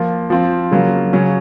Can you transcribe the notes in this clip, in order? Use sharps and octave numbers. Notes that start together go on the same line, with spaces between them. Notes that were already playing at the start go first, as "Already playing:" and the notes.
Already playing: F3 A#3 F4
F3 C4 F4
C#3 F#3 A#3 F4
C#3 F#3 C#4